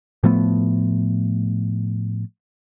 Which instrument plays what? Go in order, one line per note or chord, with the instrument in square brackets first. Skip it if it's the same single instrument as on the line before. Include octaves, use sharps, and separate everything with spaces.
[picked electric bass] A2 F3 A3 B3